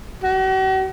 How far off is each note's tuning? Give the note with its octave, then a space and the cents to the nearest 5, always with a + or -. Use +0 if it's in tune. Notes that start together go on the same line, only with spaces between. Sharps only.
F#4 +45